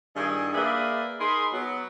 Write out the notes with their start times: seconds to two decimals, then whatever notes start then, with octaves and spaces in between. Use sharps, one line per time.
0.16 G2 D#3 E4 G#4
0.55 A#3 G#4 B4 D5 E5
1.20 D#4 G#4 A#4 B5 C6
1.53 F#3 B3